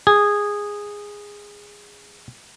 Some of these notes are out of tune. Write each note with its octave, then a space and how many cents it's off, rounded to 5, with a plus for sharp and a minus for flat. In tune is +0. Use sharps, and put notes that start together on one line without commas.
G#4 -10